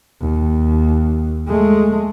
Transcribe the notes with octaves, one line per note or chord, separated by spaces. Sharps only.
D#2
G#3 A3